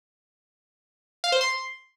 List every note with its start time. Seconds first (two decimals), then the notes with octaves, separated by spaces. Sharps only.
1.24 F5
1.32 C5
1.41 C6